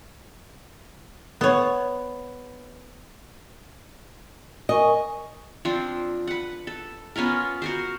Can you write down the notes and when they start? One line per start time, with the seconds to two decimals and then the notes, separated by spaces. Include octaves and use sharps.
1.41 B3 C#5
4.69 A#4 D#5 G#5 C#6
5.65 F3 C4 D4
6.27 B4 F#5
6.67 A4
7.16 B3 C#4 F4 A#4
7.62 F#4 A#4 C5